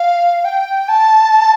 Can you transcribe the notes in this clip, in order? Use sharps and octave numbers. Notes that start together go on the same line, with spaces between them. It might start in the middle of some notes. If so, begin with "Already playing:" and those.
Already playing: F5
G5
A5